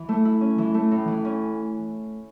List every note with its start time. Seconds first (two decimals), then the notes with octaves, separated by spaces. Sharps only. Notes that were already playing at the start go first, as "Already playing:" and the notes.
Already playing: E3
0.09 A3
0.25 E4
0.41 C#4
0.58 E3
0.74 A3
0.91 A2
1.08 E3
1.25 C#4